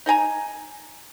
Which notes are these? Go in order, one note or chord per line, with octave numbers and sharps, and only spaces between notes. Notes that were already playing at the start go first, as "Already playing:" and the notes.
D#4 D#5 G#5 A#5